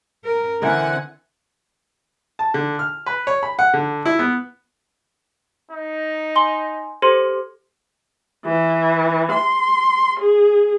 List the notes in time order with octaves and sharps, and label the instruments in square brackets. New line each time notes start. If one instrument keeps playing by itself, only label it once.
[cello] A#4
[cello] D3 [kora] E3 E4 A#4 [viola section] C4 F#5 G#5
[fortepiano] A5
D3
F6
B4
C#5
B5
F#5
D3
E4
B3
[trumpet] D#4
[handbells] G#5 [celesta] C6 G7
[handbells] G4 A4 C5 [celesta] C6
[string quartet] E3
C6
G#4